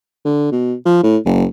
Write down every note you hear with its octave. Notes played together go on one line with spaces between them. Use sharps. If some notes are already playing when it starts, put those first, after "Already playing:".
D3
B2
F3
A2
F#1